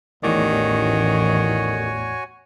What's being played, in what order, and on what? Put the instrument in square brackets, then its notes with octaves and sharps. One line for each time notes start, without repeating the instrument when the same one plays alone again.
[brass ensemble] A1 [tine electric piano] E2 A2 D5 [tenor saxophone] D#3 [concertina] F#4 C#5 G#5